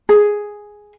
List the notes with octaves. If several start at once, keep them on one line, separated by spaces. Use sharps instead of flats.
G#4